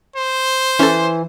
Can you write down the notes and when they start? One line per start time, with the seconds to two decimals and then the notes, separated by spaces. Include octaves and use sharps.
0.16 C5
0.79 E3 C#4 A4